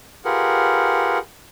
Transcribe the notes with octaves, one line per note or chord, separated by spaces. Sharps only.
F4 G4 G#4 A#4 B4 F#5